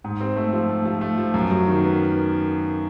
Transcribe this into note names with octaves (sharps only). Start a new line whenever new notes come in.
G#2
C4
A3
F3
A3
F3
A3
F3
F#2
F#3
D#3
B3